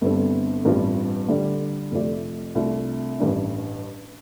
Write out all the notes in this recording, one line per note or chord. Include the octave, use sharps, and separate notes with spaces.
G1 G2 G3 C4 A4
A1 G2 G3 C4 F4
D3 G3 D4 G4
F2 C3 A3 F4 D5
C2 C3 A3 D4 F4
A1 G2 G3 D4